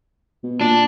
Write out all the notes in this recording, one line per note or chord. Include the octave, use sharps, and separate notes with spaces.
B2
A#2 D4